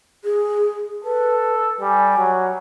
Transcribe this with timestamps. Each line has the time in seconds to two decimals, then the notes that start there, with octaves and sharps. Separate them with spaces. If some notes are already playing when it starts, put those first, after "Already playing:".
0.24 G#4
1.04 A4 B4
1.80 G3 G#5
2.18 F#3